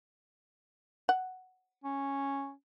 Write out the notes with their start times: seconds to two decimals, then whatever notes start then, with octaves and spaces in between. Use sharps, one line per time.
1.09 F#5
1.84 C#4